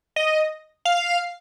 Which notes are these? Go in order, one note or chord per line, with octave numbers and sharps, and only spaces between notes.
D#5
F5